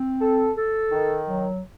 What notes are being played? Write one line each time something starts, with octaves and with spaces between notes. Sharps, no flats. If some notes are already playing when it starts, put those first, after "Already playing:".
Already playing: C4
A4
A4
D#3
F#3